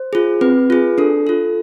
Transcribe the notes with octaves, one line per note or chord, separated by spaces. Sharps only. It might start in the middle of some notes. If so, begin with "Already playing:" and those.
Already playing: C5
F4 G#4
C4 B4
F4 G#4
D4 A4
F4 A4